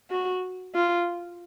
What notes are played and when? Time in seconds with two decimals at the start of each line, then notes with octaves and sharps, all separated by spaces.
0.11 F#4
0.75 F4